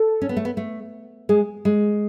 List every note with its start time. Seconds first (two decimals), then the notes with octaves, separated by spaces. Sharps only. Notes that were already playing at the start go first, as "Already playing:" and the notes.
Already playing: A4
0.22 C#4
0.29 B3
0.37 A3
0.45 B3
0.57 A3
1.29 G#3 G#4
1.65 G#3